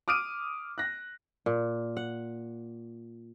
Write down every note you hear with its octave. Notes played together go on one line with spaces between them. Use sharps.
D6 D#6 F6 D7 D#7
F#6 A#6
A#2
F#5